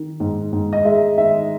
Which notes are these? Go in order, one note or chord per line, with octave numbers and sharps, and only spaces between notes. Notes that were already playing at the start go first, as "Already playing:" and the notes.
Already playing: D#3
G#2
G#2
D#5
G#3 E5
D#3 E5